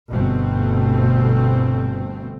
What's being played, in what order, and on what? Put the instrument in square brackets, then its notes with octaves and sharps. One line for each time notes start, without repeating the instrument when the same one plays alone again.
[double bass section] G1 B2 A3 C4